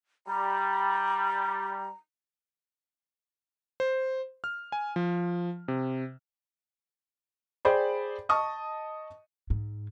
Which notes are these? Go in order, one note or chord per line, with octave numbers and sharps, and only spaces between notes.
G3 A#5
C5
F6
G#5
F3
C3
G#4 C5 D5 G5 B5
D#5 A5 C#6 D#6
G#2